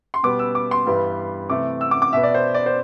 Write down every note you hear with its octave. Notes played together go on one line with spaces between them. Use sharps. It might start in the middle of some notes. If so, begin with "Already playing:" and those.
C6
B2 G3 B3 D6
E6
D6
C6
G2 E3 G3 B3
C3 E3 A3 D6
E6
D6
D6
B2 B3 E5
D5
C5
D5
C5